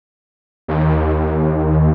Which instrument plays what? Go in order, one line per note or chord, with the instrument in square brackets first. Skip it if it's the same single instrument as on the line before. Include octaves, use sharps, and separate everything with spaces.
[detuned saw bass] D#2